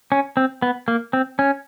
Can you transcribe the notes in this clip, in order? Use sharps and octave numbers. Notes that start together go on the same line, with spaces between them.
C#4
C4
B3
A#3
C4
C#4